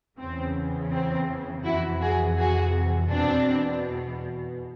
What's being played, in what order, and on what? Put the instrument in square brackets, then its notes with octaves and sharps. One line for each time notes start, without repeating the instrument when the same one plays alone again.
[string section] E2 C#3 E3 C4
C4
F2 C3 E3 E4 F#4
F#4 G#4
F#4 G#4
E2 B2 C4 D4